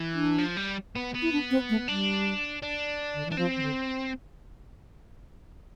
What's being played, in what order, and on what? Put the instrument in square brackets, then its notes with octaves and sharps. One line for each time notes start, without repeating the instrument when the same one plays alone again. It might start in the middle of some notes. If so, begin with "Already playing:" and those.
Already playing: [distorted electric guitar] E3
[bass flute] D4
[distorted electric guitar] F3
G3
B3
B3
[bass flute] E4
D4
C4
A3
[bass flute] G3 [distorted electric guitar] D4
[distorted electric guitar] D4
[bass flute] D3
E3
[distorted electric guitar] D4
[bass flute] F3 [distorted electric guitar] C4
[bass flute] E3
D3